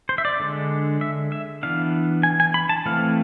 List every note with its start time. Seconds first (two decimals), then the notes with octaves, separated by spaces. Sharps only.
0.09 C5
0.18 E5
0.25 D5
0.40 D3 G#3 D4
1.01 E5
1.32 E5
1.63 E3 B3 D4 F5
2.23 G#5
2.40 G#5
2.54 B5
2.69 A5
2.86 E3 A3 C4 F5